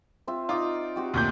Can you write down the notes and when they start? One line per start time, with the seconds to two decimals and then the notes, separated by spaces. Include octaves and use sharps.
0.27 C4 F4 E5
0.49 D#4 F4 D5 D#5
0.96 C4 F#4 G4
1.14 D2 A#2 G6